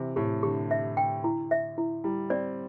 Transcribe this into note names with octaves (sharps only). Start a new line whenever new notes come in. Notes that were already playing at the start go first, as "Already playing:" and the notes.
Already playing: C3 E3
A2 G4
D3 G4
E5
G5
E4
E5
E4
G3 E4
C4 D5